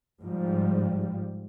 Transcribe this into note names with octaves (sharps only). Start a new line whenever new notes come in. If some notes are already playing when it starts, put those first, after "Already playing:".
G#2 F3 G3